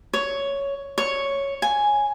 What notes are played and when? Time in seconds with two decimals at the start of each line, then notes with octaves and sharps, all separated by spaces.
0.13 C#5
0.98 C#5
1.62 G#5